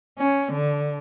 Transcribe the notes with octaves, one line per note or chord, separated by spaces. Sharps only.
C#4
D3